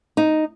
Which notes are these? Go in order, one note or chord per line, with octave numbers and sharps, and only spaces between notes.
D#4